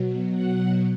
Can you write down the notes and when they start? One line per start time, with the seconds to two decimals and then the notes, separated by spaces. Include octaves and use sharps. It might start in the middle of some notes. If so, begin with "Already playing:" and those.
Already playing: B2 F#3
0.31 B2 F#3 F#5